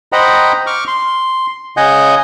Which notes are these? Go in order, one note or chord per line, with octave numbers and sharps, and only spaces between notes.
C5 D#5 F#5 G5 A#5 B5
C#6 D6 F6
C6
C#3 D#5 F#5 G#5 G6